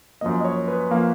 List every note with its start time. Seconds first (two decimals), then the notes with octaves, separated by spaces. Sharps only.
0.21 F#2 F3 A#3 D#5
0.41 D#5
0.45 C#5
0.68 B4
0.91 F3 A#3 F5